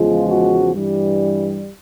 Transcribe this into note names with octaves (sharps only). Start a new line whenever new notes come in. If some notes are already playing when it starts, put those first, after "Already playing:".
Already playing: E2 C#3 F3 G#3 F4
F#4
G2 E3 G3